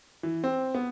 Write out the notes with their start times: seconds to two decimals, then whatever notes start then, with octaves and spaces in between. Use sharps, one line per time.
0.23 E3
0.44 C4
0.75 B3